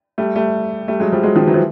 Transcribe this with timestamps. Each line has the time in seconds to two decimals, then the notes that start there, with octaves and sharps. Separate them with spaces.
0.18 G3 A3
0.35 G3 A3
0.88 G3 A3
1.00 F#3 G#3
1.12 F3 G3
1.23 F#3 G#3
1.36 D#3 F3
1.47 E3 F#3
1.54 F3